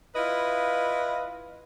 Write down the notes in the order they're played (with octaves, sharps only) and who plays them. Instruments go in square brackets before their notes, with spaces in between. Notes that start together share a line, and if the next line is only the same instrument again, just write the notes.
[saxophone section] E4 F4 B4 D#5